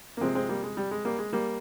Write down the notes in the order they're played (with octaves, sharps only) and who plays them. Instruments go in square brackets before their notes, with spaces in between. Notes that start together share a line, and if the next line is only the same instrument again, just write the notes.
[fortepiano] A#3
C3 F3 G#3 C4
G#3 C4
G3 A#3
G#3
G3
G#3
G3 A#3
G#3
G3 A#3